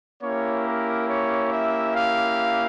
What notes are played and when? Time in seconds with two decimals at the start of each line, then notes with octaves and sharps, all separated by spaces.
0.22 A#3 C#4 E4 G4 C#5
0.66 A#4
1.09 C#5
1.52 E5
1.95 F5